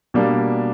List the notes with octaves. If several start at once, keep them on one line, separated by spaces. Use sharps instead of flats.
B2 G3 A#3 D4